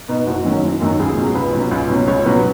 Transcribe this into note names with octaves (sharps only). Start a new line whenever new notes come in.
B2 B3 D#4
F#1 F#4
F#2 D#3 F#3 C#4
F#1
F#2 D#3 F#3 C#4
C#2 G#4
B2 F#3 C#4
G#4
C#2 B4
B2 F#3 C#4
C#2
B2 F#3 C#4
C#2 C#5
B2 F#3 C#4 B4